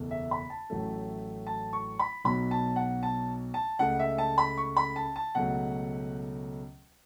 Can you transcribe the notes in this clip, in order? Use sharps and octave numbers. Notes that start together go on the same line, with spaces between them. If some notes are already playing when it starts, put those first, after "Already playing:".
Already playing: F#1 E2 B2 A3
E5
B5
A5
A1 A2 F#3 A3
A5
C#6
B5
B1 B2 F#3 B5
A5
F#5
A5
A5
C#2 C#3 A3 F#5
E5
A5
B5
C#6
B5
A5
A5
C#2 B2 F#3 A3 F#5